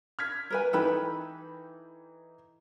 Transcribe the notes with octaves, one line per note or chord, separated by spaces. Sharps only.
F6 G#6 B6
A#4 B4 G#5
E3 D#4 A4 B4 G5 B5